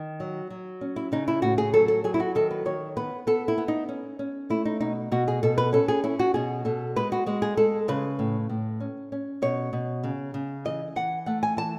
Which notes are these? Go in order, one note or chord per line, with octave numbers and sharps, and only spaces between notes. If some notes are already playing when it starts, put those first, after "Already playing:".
Already playing: D#3
F#3
F#3
C#4
E4
C#3 D#4
E4
A2 F#4
G#4
F#3 A4
A4
F#3 G#4
E4
F#4
D#3 A4
B4
D#3 C#5
B3 B4
B3 A4
E4
B3
D#4
C#4
C#4
A3 E4
D#4
B2 D#4
B2 F#4
G#4
B2 A4
B4
C#4 A4
G#4
C#4 E4
F#4
B2 G#4
B2 A4
G#3 B4
F#4
G#3 F#4
G#4
G#3 A4
C#3 B4
A2
A2
C#4
C#4
B2 C#5
B2
C#3
C#3
E3 D#5
E3 F#5
A3 F#5
G#5
E3 A5